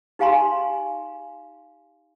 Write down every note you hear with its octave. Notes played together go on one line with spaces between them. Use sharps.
D#4 G4 F5 G#5 A#5 C6